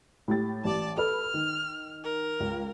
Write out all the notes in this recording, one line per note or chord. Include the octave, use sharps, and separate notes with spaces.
A2 G4 A6
A1 D5 A5
A4 B4 F6
D#3
A#4
C#2